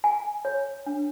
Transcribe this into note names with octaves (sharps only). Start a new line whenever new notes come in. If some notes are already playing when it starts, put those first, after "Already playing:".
G#5
C#5
D4